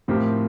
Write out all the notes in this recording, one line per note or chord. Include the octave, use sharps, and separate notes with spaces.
A2 F3 C4 G4 A#4